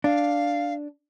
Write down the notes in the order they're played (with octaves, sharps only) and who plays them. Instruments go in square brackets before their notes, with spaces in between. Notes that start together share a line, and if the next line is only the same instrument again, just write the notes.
[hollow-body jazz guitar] D4 [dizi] F5